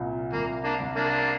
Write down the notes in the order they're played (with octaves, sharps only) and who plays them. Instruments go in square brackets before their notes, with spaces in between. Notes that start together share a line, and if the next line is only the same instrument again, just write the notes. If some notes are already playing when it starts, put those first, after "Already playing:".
Already playing: [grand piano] C2 A#2
[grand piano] C2 [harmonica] A#3
[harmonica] A#3 D4
[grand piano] C2
[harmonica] A#3 D4